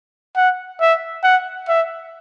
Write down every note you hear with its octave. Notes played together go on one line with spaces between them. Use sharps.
F#5
E5
F#5
E5